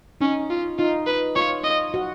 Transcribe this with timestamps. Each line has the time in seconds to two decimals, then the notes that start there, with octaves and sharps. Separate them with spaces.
0.21 C#4 D#4
0.50 F4
0.78 D#4 F4
1.06 B4
1.35 F4 C#5
1.64 D#5
1.94 F#4